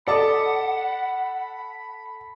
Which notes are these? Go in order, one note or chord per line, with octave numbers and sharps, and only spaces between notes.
A4 D5 D#5 F#5 A5 B5